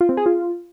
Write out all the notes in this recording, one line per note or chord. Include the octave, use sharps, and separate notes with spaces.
F4
C4
G#4
F4